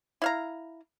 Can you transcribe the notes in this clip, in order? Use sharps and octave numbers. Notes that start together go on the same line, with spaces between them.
E4 F5 A#5